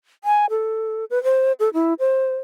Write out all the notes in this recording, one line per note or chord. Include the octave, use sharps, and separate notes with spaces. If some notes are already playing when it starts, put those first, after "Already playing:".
G#5
A4
B4
C5
A4
E4
C5